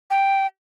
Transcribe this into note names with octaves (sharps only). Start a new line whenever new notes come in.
G5